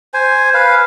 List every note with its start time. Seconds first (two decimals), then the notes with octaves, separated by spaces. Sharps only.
0.14 C5 G#5
0.54 B4 F5